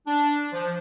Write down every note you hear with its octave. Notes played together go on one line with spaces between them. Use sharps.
D4
F3